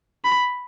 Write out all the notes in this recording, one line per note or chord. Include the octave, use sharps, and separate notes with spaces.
B5